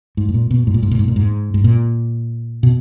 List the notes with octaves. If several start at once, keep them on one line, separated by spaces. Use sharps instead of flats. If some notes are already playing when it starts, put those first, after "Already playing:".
G#2
G#2
A#2
B2
G#2
A#2
G#2
A#2
G#2
A#2
G#2
G#2
A#2
B2